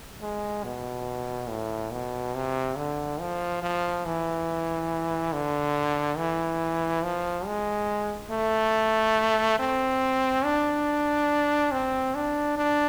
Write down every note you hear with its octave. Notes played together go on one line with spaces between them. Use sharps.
G#3
B2
A2
B2
C3
D3
F3
F3
E3
D3
E3
F3
G#3
A3
C4
D4
C4
D4
D4